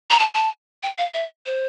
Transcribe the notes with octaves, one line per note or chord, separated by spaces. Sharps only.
A#5
A5
A5
G5
F5
E5
C5